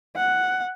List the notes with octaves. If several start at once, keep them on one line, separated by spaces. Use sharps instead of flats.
F#5